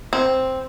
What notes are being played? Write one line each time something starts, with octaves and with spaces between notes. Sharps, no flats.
C4